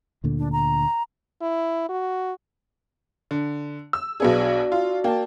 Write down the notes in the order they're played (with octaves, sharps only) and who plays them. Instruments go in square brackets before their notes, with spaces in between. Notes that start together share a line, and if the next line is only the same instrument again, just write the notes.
[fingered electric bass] D2 A#2 D3
[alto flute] D4
A#5
[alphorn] E4
F#4
[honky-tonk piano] D3
E6
[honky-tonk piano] B1 B3 G#4 [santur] D4 F#4
[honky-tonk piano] F4
[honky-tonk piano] A#3 [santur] G5 A5